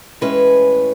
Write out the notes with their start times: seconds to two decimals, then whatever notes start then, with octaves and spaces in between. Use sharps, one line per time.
0.21 A2 E3 G#3 C#4 B4